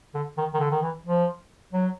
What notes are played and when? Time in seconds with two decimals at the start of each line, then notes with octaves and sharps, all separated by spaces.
0.14 D3
0.38 D#3
0.54 D#3
0.60 D3
0.71 D#3
0.83 E3
1.06 F3
1.73 F#3